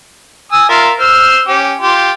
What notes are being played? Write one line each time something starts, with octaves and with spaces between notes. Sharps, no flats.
G#5 D#6 E6
F4 A#4 E5
C5 E6 F6
C#4 G4
F4 G4